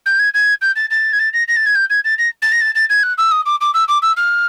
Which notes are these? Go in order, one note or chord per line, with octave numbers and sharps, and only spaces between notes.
G6
G#6
G#6
G6
A6
A6
G#6
A6
A#6
A#6
A6
G#6
G6
G#6
A6
A#6
A6
A#6
A6
A6
G#6
F#6
E6
D#6
D6
D6
E6
D6
E6
F6